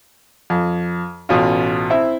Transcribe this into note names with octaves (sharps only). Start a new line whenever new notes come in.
F2
A1 B2 C#4 F4
C4 E4 E5